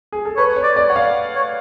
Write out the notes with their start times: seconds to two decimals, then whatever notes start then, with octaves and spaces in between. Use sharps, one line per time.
0.12 G#4
0.25 A4
0.37 B4 C#5
0.56 C#5
0.63 D5
0.76 D5
0.89 C#5 F#5
0.96 F5
1.36 C#5